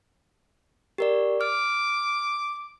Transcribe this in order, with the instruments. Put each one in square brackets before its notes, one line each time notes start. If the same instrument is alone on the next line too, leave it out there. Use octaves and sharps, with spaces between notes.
[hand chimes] G4 A#4 D5
[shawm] D6 [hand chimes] F6